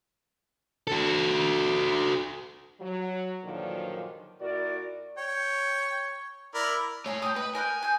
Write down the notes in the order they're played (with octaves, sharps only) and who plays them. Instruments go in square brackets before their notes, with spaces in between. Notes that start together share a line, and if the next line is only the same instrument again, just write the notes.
[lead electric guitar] F#4 A4
[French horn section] F#3
G2 A#2 D3 D#3 F3 F#3
A#2 E4 F#4 A#4 D5
[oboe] C#5 [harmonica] G5
[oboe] E4 [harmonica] A#4 D5 B5
[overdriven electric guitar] A3 C#5 [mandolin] G#4 G#5 A#5
[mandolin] G5 G#5 D#6
[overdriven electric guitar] B4 [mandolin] D#5 B5
[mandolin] A#4 G5 F#6 [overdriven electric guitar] G#5
[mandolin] G#4 G6